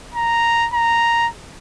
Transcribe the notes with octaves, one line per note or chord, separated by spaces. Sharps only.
A#5
A#5